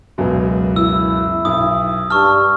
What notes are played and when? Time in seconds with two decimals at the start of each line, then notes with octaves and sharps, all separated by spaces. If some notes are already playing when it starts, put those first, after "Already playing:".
0.18 C#2 F#2 B2
0.76 E4 E6
1.45 B1 D#6
2.10 G2 A5 C#6 F6